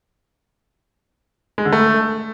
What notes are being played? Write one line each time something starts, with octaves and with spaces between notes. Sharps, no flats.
G#3
D3
A3